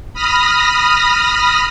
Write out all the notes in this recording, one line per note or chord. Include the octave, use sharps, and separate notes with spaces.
B5 D#6 F6 A#6